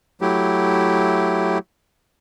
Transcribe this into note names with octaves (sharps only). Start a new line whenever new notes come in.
F#3 A3 E4 G4